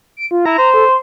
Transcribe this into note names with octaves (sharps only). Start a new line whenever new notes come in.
D7
F4
E4 A#5
C5
A4
C6